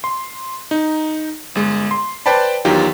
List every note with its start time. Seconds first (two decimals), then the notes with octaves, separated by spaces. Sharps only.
0.04 C6
0.71 D#4
1.55 G1 G#3
1.91 C6
2.26 B4 C5 D5 G5 A5 B5
2.65 E2 D#3 F#3 F4 G4 G5